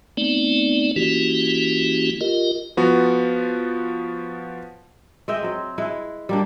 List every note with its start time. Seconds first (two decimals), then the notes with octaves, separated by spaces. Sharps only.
0.17 A3 B3 C4 D#4 D5
0.96 E3 A#3 C#4 E4 F#4 G4
2.21 F4 G4 A#4 D#5
2.77 F3 B3 F#4
5.28 G#3 D#5 E5 G5
5.43 F#3 C4
5.78 G#3 E4 B4
6.29 G3 A#3 D4